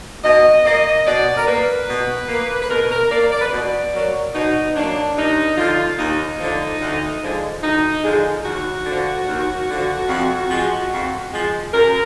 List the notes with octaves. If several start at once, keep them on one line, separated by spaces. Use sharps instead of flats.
B2 D#5
A#3 D#5
B2 D5
A#4
A#3 B4
B2
A#3
B4
B2 A#4
A#4
A#3 D5
D5
B4
B2 D5
F#3 A#3
B2 D#4
F#3 A#3 D4
D#2 D#4
D3 F3 F4
D#2 D#4
D3 F3
D2
D3 F3 G#3
D2 D#4
D3 F3 G#3
D#2 F#4
D3 F3
D#2
D3 F3
F2
F3 G#3
F2
F3 G#3
F#2 A#4